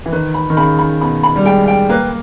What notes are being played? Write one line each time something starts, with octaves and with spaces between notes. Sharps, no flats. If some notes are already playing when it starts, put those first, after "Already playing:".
E3
D#3 B4
B5
D#3
C#3 B5
B5
B2 B5
B5
G3
G#3 G5
G5
A#3 B4